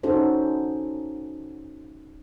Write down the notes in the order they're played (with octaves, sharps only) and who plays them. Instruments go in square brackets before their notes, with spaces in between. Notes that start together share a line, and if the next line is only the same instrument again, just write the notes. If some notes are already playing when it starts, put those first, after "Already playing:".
[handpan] C#4 D#4 F#4 A4 C5